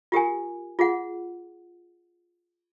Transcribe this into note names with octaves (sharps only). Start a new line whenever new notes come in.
F4 G4 A#4 G#5
F4 G#4 F#5